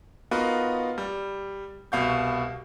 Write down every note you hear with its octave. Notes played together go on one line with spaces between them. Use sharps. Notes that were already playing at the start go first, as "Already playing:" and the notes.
B3 D#4 F4 F#4 A#4 B4
G3
C2 B2 F5 C#6 G6